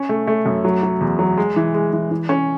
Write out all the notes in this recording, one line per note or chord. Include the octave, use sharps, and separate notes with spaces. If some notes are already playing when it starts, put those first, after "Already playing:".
Already playing: C#4
A3
A3
F#2
F#3
F#3
E2
F#3
G#3
E3
G#3
E3
E3
C#4